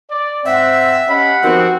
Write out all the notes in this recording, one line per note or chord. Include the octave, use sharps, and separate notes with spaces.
D5
G#2 C4 E5 F#5
C#4 G4 D#5 F5 F#5 B5
D#3 F3 B3 C4 F#4